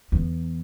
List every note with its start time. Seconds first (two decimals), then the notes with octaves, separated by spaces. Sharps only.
0.12 E2